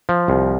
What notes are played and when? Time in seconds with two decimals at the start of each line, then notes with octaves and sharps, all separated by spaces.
0.09 F3
0.28 C2